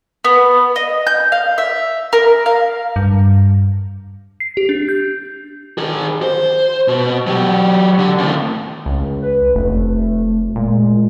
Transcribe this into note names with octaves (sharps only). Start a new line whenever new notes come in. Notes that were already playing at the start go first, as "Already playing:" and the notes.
B3
D#5
G6
F5
E5
A#4
F5
G2
C7
G4
D4
G6
D#3 G#4
C5
B2
F#3 G4
D3
D#2 A2
C#2
B4
F1 A3
A#2 G#3